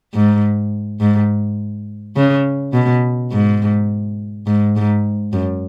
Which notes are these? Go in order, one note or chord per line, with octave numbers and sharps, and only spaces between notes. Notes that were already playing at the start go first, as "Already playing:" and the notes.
G#2
G#2
C#3
B2
G#2
G#2
G#2
F#2